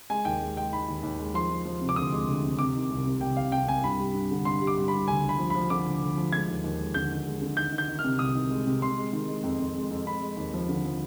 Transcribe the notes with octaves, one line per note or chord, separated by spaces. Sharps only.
G#3 G#5
D#2 G5
G#3
G#3 G5
D#3 B5
D#2
D#2
G#3
F3 C6
F3
F3
C3
D6
D2 D#6
G#3
D2
C3
C3 D6
D#3
C2
C3
C2 G5
C2 F5
C3 G5
C2 G#5
G2 B5
G3
G2
D3
G2 C6
G3
D6
G2
G3 B5
D2 G#5
D2
B5
F3
F3 B5
D3 D6
D2
D2
F3
G#3 G#6
D#2
D#2
G#3
D3 G6
D#2
G#3
D3
D#3 G6
D#3
G6
D#3
F6
C3
C2 D#6
D#3
G#3
C3
G#3 C6
G#3
D#3
G#3
F2
F2
G#3
F2
G#3 B5
G#3
D#2
F3
D3
F3